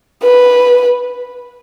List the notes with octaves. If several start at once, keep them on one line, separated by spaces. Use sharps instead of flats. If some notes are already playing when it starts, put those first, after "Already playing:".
B4